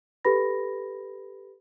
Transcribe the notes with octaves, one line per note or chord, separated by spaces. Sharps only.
G4 A4 B4 B5 A#6